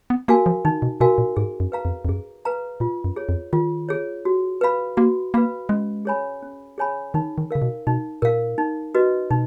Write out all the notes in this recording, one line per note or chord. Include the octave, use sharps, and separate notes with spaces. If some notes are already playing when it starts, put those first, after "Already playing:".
B3
A#3 F#4 A#4 F5 G#5
F3
D#3 D#4
B2
B2 F#4 A#4 F5 G#5
A#2
G#2 G#4
F#2
B4 F5 A#5
F2
F2
F#2 G#4
B4 F5 A#5
A#2 F4
F#2
G#4 C#5
F2
D#3 F4
G#4 C#5
F#4
B4 F5 B5
A#3 F#4
A#3 B4 F5 B5
G#3 C#4
G#4 C#5 G#5 B5
C#4
G#4 C#5 G#5 B5
D#3 D#4
D#3
C#3 A#4 F5
B2
B2 D#4
A#2 A#4 F5
D#4
F#4 B4 D#5
B2 D#4